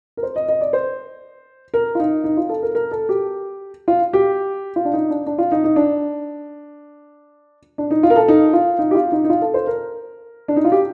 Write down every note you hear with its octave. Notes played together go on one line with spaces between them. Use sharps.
A#4
C5
D#5
D#5
D5
C5
A#4
F4
D#4
D#4
F4
A4
A#4
A#4
A4
G4
F4
G4
F4
D4
D#4
D4
D4
F4
D#4
D#4
D4
D4
D#4
F4
A#4
A4
D#4
F4
D#4
G4
F4
D#4
D#4
F4
A4
C5
A#4
D4
D#4
F4
G4